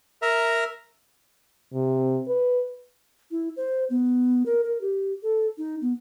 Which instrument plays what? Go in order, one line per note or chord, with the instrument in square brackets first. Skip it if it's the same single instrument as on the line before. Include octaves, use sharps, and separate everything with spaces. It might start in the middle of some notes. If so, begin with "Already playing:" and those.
[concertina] A#4 E5 A#5
[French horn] C3
B4
[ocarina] E4
C5
B3
A#4
A#4
G4
A4
D#4
B3